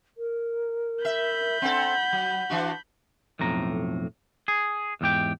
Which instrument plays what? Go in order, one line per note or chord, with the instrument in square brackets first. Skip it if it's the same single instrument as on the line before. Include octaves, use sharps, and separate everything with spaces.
[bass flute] A#4
[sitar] E5 [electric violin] B5 G6
[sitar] C4 D4 A4 [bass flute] F#5
[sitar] F#3
E3 D4 F#4
[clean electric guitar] B1 F2 A2 A#5
G#4
E2 G#2 G4 G5